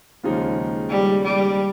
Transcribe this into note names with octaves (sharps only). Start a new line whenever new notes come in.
D#2 C#3 F3 G#3 D#4
G3
G3